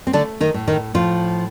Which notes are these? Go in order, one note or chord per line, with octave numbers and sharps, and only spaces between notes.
C4
D3 A3 D4
D#3 D#4
A2
D#3 D#4
A2 F3 F4